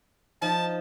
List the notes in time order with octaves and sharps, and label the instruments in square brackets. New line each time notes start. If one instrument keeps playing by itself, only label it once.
[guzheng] F3 D#4 [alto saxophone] A5